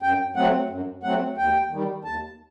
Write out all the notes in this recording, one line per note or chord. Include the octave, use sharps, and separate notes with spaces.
F#2 G5
F#3 A3 C4 F#5
F#2
F#3 A3 C4 F#5
D#2 G5
D#3 G3
D#2 A5